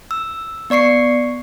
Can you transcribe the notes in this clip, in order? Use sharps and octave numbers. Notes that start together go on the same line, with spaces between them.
E6
B3 D5 C#6 C7 C#7